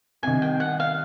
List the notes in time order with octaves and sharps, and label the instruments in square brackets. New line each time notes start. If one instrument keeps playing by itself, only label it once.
[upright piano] C2 C3 D#3 [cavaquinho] G#5
[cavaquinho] G5
F#5
F5